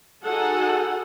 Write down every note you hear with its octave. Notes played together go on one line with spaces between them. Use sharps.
D#4 F#4 G#4 A4 F#5